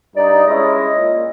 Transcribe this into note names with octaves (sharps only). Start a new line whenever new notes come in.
G2 D#4 D5
G#3 C#4 E4 D#5
A#2